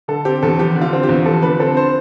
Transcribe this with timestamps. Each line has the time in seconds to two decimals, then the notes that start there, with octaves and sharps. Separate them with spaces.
0.08 D3 A4
0.25 C4 G4
0.43 E2 A4
0.59 F3 G4
0.75 D3
0.81 F4
0.93 C4
1.03 G4
1.09 E2
1.26 F3 A4
1.42 D3 B4
1.60 C4 A4
1.77 C5